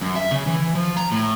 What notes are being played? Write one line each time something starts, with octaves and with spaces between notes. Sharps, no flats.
F#2
E5
C#3
E3
F3
A#5
A2